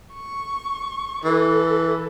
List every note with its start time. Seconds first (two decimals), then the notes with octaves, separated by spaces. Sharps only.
0.13 C#6
1.25 E3 A4